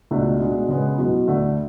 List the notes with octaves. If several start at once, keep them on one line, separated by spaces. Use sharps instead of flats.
C#2 B2 A3 D4
B2 G#3 D4
C#3 G#3 B3
E2 B2 F#3
D2 D3 A3 D4